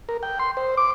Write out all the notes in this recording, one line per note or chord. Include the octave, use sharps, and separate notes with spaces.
A#4
G5
C6
C5
D6